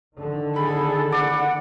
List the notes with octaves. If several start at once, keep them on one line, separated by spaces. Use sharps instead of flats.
D3 D#3
G#4 A4 B5
D5 F#5